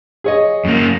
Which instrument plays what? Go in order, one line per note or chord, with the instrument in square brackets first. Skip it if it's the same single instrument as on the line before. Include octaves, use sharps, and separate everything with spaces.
[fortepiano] G#4 C#5 D#5
[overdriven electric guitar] F#2 A#3